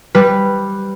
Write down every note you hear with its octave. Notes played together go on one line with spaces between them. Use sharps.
G3 B4